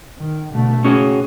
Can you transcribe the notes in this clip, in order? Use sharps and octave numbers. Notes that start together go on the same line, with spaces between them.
D#3
B2 D3 A3
C#3 C#4 F#4 G#4